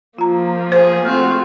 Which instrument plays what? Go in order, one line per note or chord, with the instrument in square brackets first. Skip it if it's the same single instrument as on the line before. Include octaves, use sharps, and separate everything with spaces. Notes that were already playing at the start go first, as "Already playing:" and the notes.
[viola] F3 A#3 [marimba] F4 A#5
[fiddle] G#4 [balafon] C5
[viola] A3 F#4 [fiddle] C4 F4 [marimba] F6